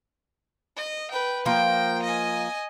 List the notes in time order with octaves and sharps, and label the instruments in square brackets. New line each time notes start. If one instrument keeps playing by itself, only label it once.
[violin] D#5
B4 G5
[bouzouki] F3 A#3 [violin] G5
[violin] D#5 G#5